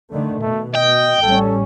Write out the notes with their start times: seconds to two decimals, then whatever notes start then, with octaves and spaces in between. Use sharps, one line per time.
0.12 D3 D#3 A3
0.42 B2 A3
0.75 D#5 G5
1.23 A1 G3 C#4 A4